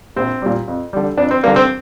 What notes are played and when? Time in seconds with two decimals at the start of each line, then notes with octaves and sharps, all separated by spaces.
0.16 A#1 C4
0.42 A#2 G3
0.68 F2
0.93 D3 G3
1.17 F2 D4
1.31 C4
1.43 G3 A#3
1.47 D3
1.56 C4